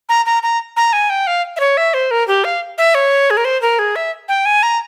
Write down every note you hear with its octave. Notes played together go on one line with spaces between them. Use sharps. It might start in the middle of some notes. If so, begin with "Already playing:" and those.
A#5
A#5
A#5
A#5
G#5
G5
F5
E5
C#5
E5
C5
A#4
G4
F5
E5
C#5
G#4
A#4
C5
A#4
G#4
E5
G5
G#5
A#5